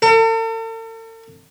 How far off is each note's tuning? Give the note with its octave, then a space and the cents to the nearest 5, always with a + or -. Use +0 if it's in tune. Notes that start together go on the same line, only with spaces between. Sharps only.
A4 +45